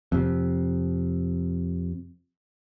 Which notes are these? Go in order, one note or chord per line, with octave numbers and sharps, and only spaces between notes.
F2 C3